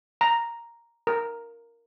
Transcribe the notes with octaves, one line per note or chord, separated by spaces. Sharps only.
A#5
A#4